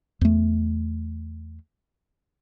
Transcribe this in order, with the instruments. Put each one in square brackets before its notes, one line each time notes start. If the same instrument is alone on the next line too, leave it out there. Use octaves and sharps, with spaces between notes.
[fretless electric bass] E2 A3